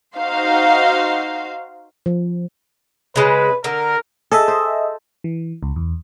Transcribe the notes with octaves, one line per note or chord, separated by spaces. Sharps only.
D#4 F#4 C5 F5
F3
C#3 G#3 B4
D3 A#4
G#4 A4 D#5 E5
C5
E3
C#2
E2